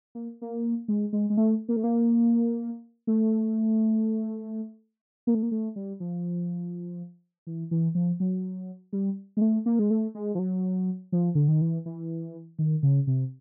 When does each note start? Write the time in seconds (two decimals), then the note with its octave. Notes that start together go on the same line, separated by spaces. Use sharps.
0.15 A#3
0.42 A#3
0.88 G#3
1.13 G#3
1.30 G#3
1.37 A3
1.69 A#3
1.76 A3
1.84 A#3
3.07 A3
5.27 A#3
5.35 A3
5.43 A#3
5.51 A3
5.76 G3
6.00 F3
7.47 E3
7.71 E3
7.95 F3
8.20 F#3
8.93 G3
9.37 G#3
9.41 A3
9.66 A#3
9.79 G#3
9.90 A3
10.15 G#3
10.35 F3
10.39 F#3
11.12 F3
11.35 D3
11.48 D#3
11.61 E3
11.86 E3
12.59 D#3
12.83 C#3
13.07 C3